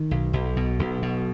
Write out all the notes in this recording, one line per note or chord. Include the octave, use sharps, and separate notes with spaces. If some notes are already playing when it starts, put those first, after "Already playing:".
Already playing: D#3
B1
B1
B2
B1
B2